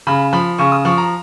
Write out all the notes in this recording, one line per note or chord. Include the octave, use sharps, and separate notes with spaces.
C#3 B5
F3 B5
C#3 C#6
D#6
F3 C#6
A#5